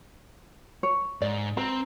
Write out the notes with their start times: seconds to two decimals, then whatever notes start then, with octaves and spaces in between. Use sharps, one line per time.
0.83 C#5
1.22 G#2 D5
1.57 C4 B4 A#5